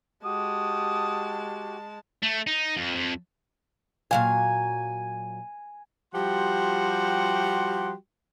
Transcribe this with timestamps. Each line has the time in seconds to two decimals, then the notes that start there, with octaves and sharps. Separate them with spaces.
0.25 G#3 F#4 G4 F#5 A5 D#6
2.23 A3
2.47 D#4
2.77 F2
2.95 F2
4.11 A#2 F#3 F5 G#5
6.14 F3 G3 F#4 G4 F#5 C6